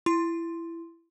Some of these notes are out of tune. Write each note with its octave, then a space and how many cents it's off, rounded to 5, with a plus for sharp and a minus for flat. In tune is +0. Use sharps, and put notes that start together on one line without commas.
E4 +20 C6 +0